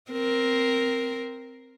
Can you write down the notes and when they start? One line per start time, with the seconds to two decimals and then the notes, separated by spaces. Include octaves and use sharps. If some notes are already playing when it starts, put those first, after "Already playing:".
0.11 C4 A#4